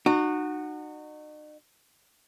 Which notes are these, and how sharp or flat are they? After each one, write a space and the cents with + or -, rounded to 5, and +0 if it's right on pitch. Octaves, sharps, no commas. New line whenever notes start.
D#4 -40 F#4 -5